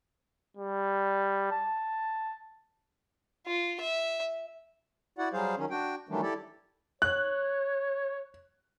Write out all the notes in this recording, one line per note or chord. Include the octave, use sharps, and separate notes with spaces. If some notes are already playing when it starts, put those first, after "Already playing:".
G3
A5
F4
E5
E4 F#4 D5 F#5
F#3 G3 G#4 C5 F5
D#3 F#3 C#4
D4 F#4 G5
D#3 E3 F#3 G3 A3 D4
E4 G4 A4 D5
C#5 F#6